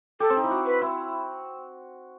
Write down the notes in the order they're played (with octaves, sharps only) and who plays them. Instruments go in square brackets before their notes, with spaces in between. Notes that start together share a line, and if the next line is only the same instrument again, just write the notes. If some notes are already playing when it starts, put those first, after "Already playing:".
[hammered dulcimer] G4 [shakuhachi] A4
[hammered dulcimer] C4
D#4
E4
F#4
[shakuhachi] B4
[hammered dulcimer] E4